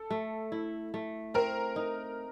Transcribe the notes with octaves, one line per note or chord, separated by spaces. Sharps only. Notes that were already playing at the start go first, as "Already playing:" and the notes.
Already playing: A4
A3
E4
A3
C4 A#4
D#4